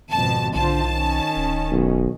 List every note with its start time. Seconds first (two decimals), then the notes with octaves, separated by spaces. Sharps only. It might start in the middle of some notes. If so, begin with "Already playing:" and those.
0.11 G#1 F2 B2 A5
0.55 B1 D3 F4 C5 A5
0.89 D#3 C#4
1.36 D1
1.71 B1